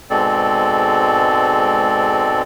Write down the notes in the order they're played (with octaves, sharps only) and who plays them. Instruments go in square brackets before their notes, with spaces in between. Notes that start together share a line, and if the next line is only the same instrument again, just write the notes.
[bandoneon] G#2 B2 G#3 C4 A4 D5